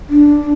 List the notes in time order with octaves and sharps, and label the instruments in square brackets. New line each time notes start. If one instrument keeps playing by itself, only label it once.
[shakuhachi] D4